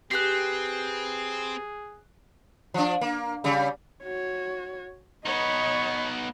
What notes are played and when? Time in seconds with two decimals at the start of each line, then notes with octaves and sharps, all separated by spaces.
0.11 C4 G4 G#4 B4 F#6 C7
2.74 F3 D4
3.01 A#3
3.44 C#3 G3
4.04 F#4 C#5
5.26 B3 D#4 C#5 D#5 B5